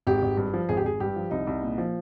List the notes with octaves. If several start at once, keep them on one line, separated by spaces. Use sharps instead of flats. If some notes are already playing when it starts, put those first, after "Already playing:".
G#1 G4
G#1
G2
F3
G#1 G#4
G4
G#1 G#4
G2 G4
F3
C2 D#4
C2
A#2
F3